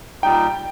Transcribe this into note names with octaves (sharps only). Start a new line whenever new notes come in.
A#2 G3 D#4 G5